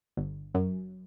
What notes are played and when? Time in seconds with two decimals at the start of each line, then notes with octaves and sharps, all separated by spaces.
0.17 G1
0.55 F#2